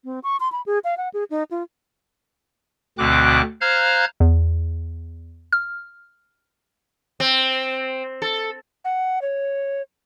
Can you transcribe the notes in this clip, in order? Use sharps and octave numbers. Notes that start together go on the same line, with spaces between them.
C4
C#6
C6
B5
G#4
F5
F#5
G#4
D#4
F4
D2 B2 D3 C4 D6 F#6
C5 F5 A#5 F6 F#6 G#6
E2
F6
C4
A4
F#5
C#5